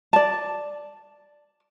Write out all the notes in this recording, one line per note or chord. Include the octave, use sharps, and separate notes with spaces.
D5 A5